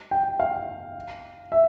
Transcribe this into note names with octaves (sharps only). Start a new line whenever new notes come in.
G5
F5
E5